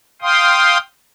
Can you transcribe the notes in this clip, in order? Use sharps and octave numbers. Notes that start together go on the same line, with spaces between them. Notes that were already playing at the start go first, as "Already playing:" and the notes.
F5 G5 C6 D#6